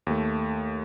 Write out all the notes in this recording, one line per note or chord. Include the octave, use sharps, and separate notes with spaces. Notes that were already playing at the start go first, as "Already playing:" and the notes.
D#2 A3